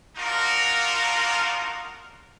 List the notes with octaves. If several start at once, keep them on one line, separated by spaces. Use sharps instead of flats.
D4 D#4 F4 F#4 A#4